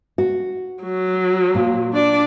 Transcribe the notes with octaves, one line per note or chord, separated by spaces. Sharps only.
F#4
F#3
A#2
D4 D5